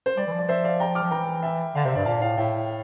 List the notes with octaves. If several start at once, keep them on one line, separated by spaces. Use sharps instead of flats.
C5
G3 D5
E3
F3
D5
C5 E5
D5 F5
G5 A#5
D6 F6
F3
E3 G5 A#5
E5 G5
D3 D5 F5
C3 C5 E5
G2 D5
A#2 F5 A5
A2 F5 A5
A2 E5 G5